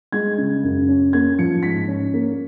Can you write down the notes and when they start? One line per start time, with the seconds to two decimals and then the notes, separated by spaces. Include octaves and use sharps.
0.12 G#3 G#6
0.38 C#3
0.63 F#2
0.89 C#4
1.13 A#3 G#6
1.39 F3 C#7
1.63 G#2 B6
1.88 C#4
2.14 A#3